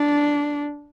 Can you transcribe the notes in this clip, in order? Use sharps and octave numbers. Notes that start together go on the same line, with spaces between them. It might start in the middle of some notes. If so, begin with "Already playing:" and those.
Already playing: D4